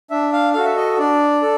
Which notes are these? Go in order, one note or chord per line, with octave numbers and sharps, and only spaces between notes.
D4 E5
F5
F#4 A4 F5
E5
D#5
D4 D5
A4